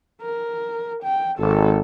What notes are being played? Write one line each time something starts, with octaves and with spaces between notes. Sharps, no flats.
A#4
G5
G#1 A4